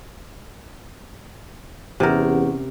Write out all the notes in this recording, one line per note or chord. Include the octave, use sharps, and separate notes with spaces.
E2 C3 C#4 G4 A#4 F#5